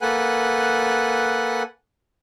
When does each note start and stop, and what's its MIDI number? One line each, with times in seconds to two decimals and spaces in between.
0.02 1.63 58
0.02 1.63 69
0.02 1.63 71
0.02 1.63 78
0.02 1.63 80
0.02 1.63 90